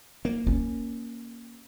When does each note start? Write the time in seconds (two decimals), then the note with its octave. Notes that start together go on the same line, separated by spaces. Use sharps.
0.25 A#3
0.47 C#4